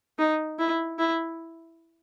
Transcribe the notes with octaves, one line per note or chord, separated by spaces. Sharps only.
D#4
E4
E4